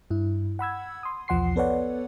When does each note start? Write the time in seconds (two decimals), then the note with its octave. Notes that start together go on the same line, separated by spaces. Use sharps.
0.11 G2 E4
0.59 F#5 B5 E6 G#6
1.03 C6 D#6
1.28 B1 E2 F3 F#5 C6 C7
1.56 B3 A4 B4 C#5 D5 F#5